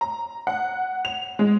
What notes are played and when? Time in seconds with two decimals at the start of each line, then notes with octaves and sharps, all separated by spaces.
0.01 A#5
0.47 F#5
1.05 F7
1.39 G#3